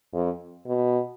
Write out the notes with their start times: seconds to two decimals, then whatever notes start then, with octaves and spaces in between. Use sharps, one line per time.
0.13 F2
0.66 B2